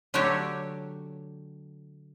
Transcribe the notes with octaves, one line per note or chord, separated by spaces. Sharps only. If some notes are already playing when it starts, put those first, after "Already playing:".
D3 F#3 A3 F#4 G4 C#5